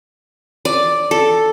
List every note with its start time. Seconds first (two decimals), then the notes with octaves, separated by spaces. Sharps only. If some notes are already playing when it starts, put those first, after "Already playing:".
0.65 D5
1.11 A4